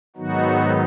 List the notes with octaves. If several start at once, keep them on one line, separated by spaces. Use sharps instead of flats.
G#2 D#3 F#3 B3 D#4 F#4